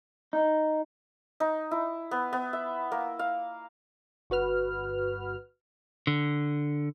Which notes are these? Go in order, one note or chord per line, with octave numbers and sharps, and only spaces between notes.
D#4
D#4
E4
B3
B3
E5
A#3
F5
G1 F#4 B4 F6
D3